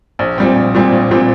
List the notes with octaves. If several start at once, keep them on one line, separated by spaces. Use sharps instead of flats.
A#1
A#2 G3 C4
A#1
A#2 G3 C4
A#1
A#2 G3 C4